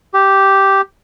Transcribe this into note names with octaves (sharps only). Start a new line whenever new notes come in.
G4